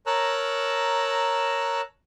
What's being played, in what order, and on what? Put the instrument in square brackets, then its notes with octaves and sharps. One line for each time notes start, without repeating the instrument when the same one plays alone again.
[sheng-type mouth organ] A#4 C#5 A5 A#5 E6 F#6